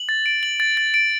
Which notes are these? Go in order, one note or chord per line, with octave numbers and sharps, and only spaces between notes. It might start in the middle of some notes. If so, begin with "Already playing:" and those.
Already playing: F#7
A6
D7
F#7
A6
A6
D7